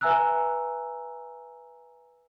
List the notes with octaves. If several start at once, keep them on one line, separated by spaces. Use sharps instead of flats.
B4 E5 G#5 A#5 E6 F#6